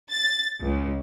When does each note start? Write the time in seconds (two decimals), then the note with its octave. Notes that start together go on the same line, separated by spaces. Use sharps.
0.10 A6
0.62 C#2